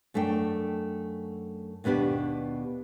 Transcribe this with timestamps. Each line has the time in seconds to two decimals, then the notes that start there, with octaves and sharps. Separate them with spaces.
0.14 F#2 A3 D4 G5
1.84 D#2 B2 B3 D4 G4